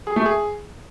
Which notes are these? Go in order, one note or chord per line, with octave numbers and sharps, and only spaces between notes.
G#4
A3
G#4